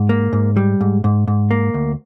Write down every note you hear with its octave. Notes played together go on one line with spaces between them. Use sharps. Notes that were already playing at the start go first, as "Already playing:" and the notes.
Already playing: G#2
A#3
G#2
G3
G#2
G#2
G#2
A#3
D2